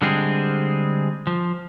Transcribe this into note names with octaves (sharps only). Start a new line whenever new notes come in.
D3 G3 G#3 C4 G#4
F3